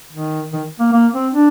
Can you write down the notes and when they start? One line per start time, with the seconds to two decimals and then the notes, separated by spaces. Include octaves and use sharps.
0.13 D#3
0.53 D#3
0.79 A#3
0.93 A#3
1.13 C4
1.33 D4